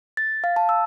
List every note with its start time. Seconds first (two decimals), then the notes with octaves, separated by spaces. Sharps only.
0.17 A6
0.44 F5
0.56 A5
0.69 E6